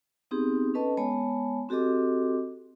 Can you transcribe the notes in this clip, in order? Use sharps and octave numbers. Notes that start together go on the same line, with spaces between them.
B3 C4 D#4 G4 G#4
C#4 A4 B4 D#5 A5
G#3 B3 C#5 G#5 A5 B5
C4 F#4 G4 A4 D#5 D6